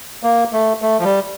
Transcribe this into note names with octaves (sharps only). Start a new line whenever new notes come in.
A#3
A3
A3
F3
G3